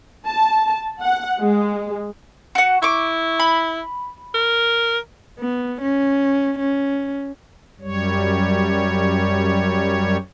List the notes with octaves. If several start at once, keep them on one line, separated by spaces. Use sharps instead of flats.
A5
F#5
G#3
F#4 F#5
E4 C#6 D6
B5
A#4
B3
C#4
C#4
F#2 G3 C#5